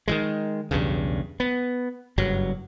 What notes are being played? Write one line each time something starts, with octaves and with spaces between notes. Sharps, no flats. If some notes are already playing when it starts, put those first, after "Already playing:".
D#3 E3 G#3
B1 E2 G2 C#3
B3
F#1 G2 F#3